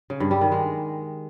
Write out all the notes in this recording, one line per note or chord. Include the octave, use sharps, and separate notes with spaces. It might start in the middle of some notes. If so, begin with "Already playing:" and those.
C#3
G2
G3
D#3
G#3